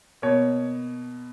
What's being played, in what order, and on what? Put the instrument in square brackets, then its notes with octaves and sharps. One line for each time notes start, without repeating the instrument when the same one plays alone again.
[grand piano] B2 A#3 C#5